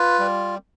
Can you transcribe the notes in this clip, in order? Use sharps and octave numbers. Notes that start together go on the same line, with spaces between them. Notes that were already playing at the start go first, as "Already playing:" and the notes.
Already playing: F4 B4
G3